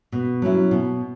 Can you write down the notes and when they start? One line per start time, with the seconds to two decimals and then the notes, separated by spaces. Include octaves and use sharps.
0.12 B2
0.42 F#3 C#4 E4
0.71 B2